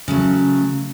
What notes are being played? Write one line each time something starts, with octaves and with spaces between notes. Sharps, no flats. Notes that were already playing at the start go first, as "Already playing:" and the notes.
C#3 F#3 A3